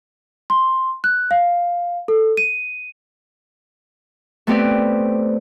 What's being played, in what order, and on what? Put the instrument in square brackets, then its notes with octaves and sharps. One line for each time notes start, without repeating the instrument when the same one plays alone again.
[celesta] C6
F#6
F5
A4
D#7
[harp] A3 B3 C4 G4 B4 D5